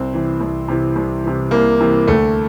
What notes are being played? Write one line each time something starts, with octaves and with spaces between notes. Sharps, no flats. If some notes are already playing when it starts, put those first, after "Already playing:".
Already playing: C2 C4
C3 E3
C2
C3 E3
C2
C3 E3
C2 A#3
C3 E3
D2 A3